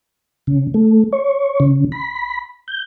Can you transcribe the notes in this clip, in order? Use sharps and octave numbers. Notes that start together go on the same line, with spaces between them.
C#3
A3
C#5
C#3
B5
G6